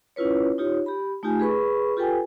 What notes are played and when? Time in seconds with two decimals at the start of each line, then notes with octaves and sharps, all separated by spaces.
0.16 C#4 E4 F4 B4 C#5
0.58 D#4 F4 G4 C#5
0.86 G4 B5
1.23 A3 D#4 F4 G4 G#5
1.40 G#4 B4 B5 C#6
1.97 F4 G4 A4 B4 G5 G#5